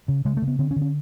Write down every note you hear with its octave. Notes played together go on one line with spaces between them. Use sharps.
C#3
C#3 G#3
A3
C#3
B3
D3 C4
C#4
D3
C#4